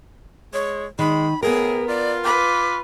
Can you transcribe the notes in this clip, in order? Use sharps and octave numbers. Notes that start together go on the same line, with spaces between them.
G#3 C#5
D#3 G#3 B5
A2 B3 G#4 A#4
F4 D5
B4 D6